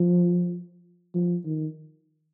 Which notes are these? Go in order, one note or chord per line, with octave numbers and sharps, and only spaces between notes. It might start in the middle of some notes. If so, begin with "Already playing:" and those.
Already playing: F3
F3
D#3